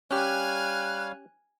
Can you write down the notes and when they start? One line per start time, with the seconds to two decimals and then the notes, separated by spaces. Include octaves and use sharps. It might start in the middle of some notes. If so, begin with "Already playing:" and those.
0.11 G3 C#4 G4 C#5 F5 G#5 F6 F#6